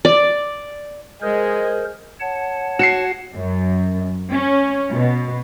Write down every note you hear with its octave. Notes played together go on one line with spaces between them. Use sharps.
D5
G#3 G#4 A#4 C5 D#5
C#5 F#5 A5
F#4 C7 C#7 E7
F#2
C#4
B2